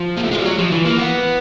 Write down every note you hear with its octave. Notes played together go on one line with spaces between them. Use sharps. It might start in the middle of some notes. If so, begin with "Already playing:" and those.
Already playing: F3
A#3
A3
G#3
G3
F#3
F3
E3
A#3
B3